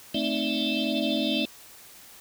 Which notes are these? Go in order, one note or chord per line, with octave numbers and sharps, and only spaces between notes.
A3 C4 D#4 D5 E5